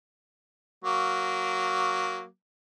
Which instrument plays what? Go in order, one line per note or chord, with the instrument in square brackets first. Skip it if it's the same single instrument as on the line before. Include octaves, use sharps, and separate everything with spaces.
[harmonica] F#3 A#3